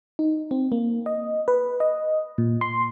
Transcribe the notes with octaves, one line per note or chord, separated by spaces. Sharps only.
D#4
C4
A#3
D#5
B4
D#5
A#2
C6